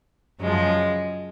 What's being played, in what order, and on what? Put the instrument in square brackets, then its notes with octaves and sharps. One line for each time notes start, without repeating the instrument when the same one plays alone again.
[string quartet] F#2 C#3 F3 G#3